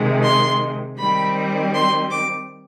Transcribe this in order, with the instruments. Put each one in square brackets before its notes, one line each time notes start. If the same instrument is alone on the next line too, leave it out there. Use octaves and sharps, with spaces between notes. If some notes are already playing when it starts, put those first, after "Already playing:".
Already playing: [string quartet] C3 D#3 G#3
C6
D#3 G3 C4 B5
C6
D6